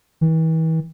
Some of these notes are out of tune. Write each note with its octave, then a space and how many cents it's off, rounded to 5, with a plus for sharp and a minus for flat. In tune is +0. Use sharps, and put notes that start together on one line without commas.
E3 -40